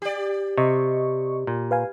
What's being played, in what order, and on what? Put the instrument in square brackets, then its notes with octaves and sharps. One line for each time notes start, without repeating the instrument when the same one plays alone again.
[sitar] G4 D5
[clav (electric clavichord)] C3 [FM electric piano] D#5 C#6
[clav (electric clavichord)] A#2
[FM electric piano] B4 F5 G#5